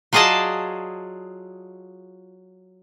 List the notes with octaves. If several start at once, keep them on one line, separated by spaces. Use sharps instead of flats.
F#3 F4 G#4 D5 D#5 A5